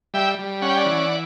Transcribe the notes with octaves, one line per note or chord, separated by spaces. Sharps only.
G3 E5 G5
G3
C#4 F#5
G5
D5 F#5
E3